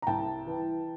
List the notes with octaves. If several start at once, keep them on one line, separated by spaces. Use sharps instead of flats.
A#5
C2 G5 A5
E3